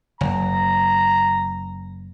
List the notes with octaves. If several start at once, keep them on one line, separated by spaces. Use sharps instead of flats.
F#1 A#5